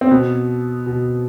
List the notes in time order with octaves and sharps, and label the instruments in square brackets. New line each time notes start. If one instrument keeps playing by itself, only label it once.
[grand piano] C4
B2 B3
B2